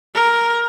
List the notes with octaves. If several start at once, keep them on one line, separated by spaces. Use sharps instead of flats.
A#4